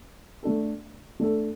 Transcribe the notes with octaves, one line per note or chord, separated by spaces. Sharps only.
A3 D4 A4
A3 D4 A4